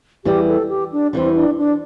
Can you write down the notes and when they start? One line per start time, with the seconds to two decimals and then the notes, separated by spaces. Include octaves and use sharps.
0.25 E2 E3 G3 G4
0.47 A4
0.69 G4
0.92 D4
1.13 E2 E3 G3 C4
1.35 D4
1.58 D4